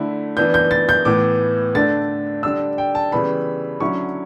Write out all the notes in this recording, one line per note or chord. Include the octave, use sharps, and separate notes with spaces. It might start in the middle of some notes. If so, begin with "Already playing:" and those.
Already playing: D3 A3 E4
E3 B3 D4 G6
G6
A6
G6
A2 E3 B3 D6
D3 A3 D4 A6
D3 G3 D4 E6
G5
A5
C#3 E3 G3 B3 B5
D3 F#3 C#4 E4 C#6